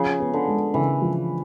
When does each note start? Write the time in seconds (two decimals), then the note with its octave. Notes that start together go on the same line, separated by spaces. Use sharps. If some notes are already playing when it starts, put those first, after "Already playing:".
Already playing: C#3 F3
0.20 B3
0.34 D3
0.47 G#3
0.74 C#3 E3
1.02 F3